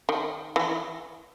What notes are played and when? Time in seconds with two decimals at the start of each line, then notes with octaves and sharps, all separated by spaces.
0.09 D#3
0.56 E3